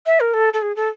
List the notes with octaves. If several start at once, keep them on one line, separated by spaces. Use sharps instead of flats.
E5
A#4
A4
A4
G#4
A4